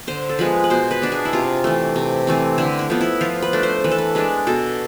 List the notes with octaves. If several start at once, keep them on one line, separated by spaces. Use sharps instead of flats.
D3 C5
A4
F3 G#3 B3 B4
B4
B2 C5
B4
B3 D4
G#4
E4
C3 F4
E3 A3
C3
E3 A3 C4
D3 E4
E4
F3 B3
E4
F3 F4
B4
A3 D4
C5
E3 B4
A4
B4
G#3 D4 B4
B2 A4